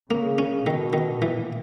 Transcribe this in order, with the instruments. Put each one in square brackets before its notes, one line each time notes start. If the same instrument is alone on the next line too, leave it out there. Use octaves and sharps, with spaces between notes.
[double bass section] C#3 [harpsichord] A#3
[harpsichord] C#4
[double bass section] B2 [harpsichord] D#3
[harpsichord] D#3
[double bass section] A#2 [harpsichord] E3